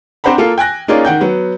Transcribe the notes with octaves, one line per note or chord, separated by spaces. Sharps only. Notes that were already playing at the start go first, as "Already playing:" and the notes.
C4 D4 C5 F#5 A#5 B5
A#3 F4 A4 F5
G5 G#5 F#6 A#6
A#3 C#4 D#4 F4 G#4 D5
D#3 F#5 G5 G6
F#3 B3